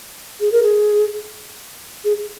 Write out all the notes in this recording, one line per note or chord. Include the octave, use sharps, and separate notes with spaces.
G#4
A#4
G#4
G#4